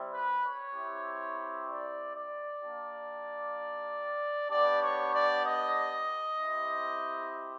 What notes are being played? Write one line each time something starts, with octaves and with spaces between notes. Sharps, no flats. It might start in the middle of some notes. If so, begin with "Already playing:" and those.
Already playing: G3 C4 E4
B4
C#5
C4 E4 G4
D5
D5
A#3 D4 G4
B3 D4 G4 D5
C#5
D5
D#5
C4 E4 G4